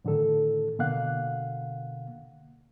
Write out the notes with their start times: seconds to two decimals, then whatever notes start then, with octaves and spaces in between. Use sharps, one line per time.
0.05 A2 D3 D#3 A4
0.79 B2 D3 A#3 F5 F#5 F#6